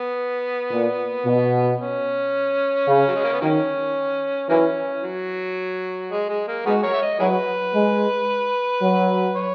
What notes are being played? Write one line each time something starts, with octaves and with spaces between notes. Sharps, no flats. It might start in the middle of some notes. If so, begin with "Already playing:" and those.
Already playing: B3
A#2
B2
C#4
C#3
F#3
G#3
A#3
B3
D#3 F#3 A#3 C#4
E3 F#3 A#3 C#4
F#3
G#3
G#3
A#3
G#3 B3 D#4 F#4
F#4 A#4 C#5
E5
D#5
F#3 E4 G#4 B4
G#3
F#3
C#5